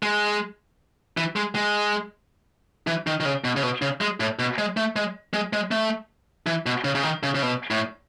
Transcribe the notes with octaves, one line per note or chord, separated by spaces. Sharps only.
G#3
E3
G#3
G#3
E3
D#3
D#3
C#3
B2
C#3
B2
C#3
G#3
A2
B2
G#3
A3
G#3
G#3
G#3
A3
E3
B2
C#3
C#3
D#3
C#3
C#3
B2
A2